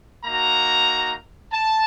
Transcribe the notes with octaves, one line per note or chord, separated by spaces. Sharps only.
A#3 D#4 F#4 A#5
A5